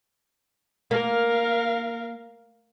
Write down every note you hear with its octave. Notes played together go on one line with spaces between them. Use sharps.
A#3 A#4 F5